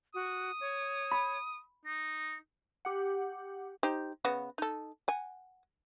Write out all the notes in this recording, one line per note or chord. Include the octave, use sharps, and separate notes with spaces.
F#4 D#6
C#5
B5
D#4 A#6
G4 F#5
D#4 G4 C5
C#3 B3 F#4
D#4 A4
F#5 G#5